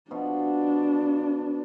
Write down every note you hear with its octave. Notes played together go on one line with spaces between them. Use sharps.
B2 F3 D4